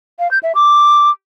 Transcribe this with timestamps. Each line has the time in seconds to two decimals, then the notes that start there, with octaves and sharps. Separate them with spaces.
0.19 F5
0.31 G6
0.43 E5
0.55 D6